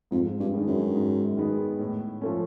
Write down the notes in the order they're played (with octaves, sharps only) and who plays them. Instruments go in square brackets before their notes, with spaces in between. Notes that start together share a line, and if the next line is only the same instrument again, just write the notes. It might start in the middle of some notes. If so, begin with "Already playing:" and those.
[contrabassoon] F2 [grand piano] G#2
[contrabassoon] G2
[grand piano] D#3 G#3 B3
[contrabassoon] F#2
[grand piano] G#2
D#3 G#3 B3
A2
F3 A3 C#4